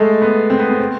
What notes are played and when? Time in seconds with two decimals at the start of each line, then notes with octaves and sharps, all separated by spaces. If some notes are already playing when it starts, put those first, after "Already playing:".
Already playing: G#3 A3
0.22 B3
0.50 C4
0.59 B3
0.68 C4
0.79 C4